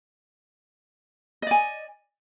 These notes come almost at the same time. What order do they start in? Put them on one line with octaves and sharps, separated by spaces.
D#5 D5 G#5